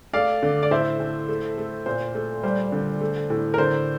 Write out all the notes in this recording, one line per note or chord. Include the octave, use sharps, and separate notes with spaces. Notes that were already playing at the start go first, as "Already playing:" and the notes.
A3 D5 F5
D3
D5
A2 C5 E5
A2
A3
A3
A#2 C5
A3
G3 C5
D3
A3
A2
A#4
D3 C5